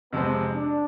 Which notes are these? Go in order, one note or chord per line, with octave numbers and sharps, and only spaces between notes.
F2 C3 G#3 B3 C4
D4